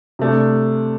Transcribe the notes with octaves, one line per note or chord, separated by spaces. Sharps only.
C3 A3 D4